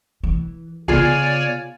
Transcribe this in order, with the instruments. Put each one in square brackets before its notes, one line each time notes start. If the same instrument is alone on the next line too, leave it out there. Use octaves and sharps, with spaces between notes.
[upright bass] E3
[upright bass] C#3 B3 [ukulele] F4 G#4 [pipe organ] C#5 D5 G#5